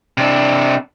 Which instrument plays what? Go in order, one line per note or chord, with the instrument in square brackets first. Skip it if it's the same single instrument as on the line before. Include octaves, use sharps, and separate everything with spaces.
[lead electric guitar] C3 D4